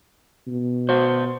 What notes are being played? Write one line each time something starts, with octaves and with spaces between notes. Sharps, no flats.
B2
F#4 C5